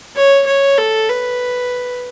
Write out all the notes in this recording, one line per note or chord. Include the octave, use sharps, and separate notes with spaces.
C#5
C#5
A4
B4